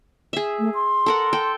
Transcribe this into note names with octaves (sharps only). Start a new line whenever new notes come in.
G#4 E5
A3
C6
A4 A#4 F#5
A4 G5